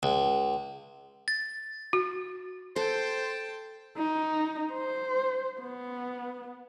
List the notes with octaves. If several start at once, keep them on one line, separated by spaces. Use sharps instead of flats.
C#2
A6
F#4
A4 C5 G5 A5
D#4
C5
B3